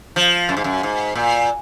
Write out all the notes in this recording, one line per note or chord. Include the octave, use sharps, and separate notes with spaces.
F3
F#2
G#2
F#2
G#2
A#2